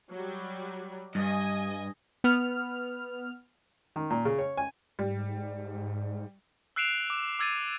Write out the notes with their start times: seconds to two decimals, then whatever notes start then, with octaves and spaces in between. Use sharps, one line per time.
0.12 F#3 G3
1.15 G2 D#5 G#5
2.24 B3 F6
3.96 D#3
4.10 A#2
4.25 C#3
4.39 C#5
4.57 G#5
4.99 G#2 G3
6.76 E6 F#6 C7 D7 E7 F7
7.10 D6
7.39 D6 E6 G#6 A6 C7 D#7